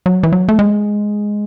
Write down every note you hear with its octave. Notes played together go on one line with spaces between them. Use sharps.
F#3
E3
F#3
A3
G#3